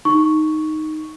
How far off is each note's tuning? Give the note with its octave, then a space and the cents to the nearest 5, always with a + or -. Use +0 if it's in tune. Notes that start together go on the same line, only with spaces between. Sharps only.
D#4 +0 C#6 +0